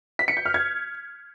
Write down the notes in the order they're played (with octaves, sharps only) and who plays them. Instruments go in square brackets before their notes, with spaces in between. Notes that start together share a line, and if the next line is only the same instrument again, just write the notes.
[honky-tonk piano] B6
C#7
G6
F6
G#6